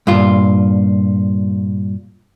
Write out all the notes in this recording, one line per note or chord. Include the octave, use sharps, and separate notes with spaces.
G2 A#2 F4